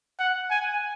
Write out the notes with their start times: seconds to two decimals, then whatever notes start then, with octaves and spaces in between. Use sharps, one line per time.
0.19 F#5
0.51 G#5